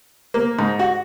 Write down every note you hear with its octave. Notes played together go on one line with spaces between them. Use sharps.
A#3
G#2
F#4